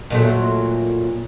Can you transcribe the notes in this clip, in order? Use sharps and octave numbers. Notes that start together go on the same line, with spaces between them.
A#2 F#3 A3